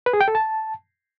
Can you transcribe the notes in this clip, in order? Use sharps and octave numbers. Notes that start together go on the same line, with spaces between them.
B4
G#4
G5
A4
A5